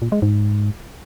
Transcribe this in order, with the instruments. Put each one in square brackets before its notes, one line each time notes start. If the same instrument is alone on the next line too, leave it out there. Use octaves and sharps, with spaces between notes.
[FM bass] A#2
G#3
G#2